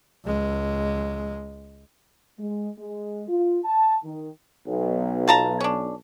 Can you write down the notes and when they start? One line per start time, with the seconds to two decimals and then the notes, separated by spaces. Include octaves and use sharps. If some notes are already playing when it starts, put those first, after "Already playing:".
0.25 C#2 G#3
2.39 G#3
2.78 G#3
3.29 F4
3.65 A5
4.04 D#3
4.67 B1
5.28 F4 A5 A#5
5.60 C#4 D4